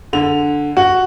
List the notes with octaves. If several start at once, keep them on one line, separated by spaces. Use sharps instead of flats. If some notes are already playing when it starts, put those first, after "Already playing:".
D3 F7
F#4